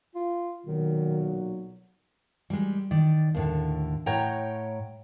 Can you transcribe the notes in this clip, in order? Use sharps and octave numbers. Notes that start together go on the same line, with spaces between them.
F4
B1 A#2 D#3 F#3
G3 G#3
D#3 D5
D#2 A2 D3
A2 C#5 F#5 G5 A#5